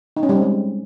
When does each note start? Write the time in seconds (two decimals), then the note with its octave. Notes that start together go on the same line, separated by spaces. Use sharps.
0.17 D#4
0.23 C#4
0.29 G3
0.36 C4
0.42 G#3